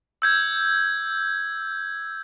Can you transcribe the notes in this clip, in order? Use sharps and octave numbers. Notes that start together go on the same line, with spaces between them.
E6 G6 G#6